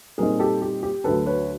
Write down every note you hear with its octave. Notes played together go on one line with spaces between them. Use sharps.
A#2 G3 C4 D#4 G#4 A#4
G4 A4
G4
G4
D2 D3 F#3 A4 B4
B4 C#5